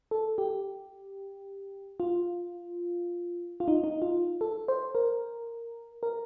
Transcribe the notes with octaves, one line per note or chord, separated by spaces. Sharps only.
A4
G4
F4
F4
D#4
D#4
F4
A4
C5
A#4
A#4